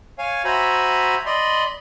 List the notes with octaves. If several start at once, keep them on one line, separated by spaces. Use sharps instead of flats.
C#5 F5 G#5
F#4 C5 E5 G#5 A#5 B5
D5 D#5 B5 C6